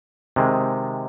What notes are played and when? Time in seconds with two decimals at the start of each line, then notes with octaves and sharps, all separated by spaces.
0.36 C3 D#3 G#3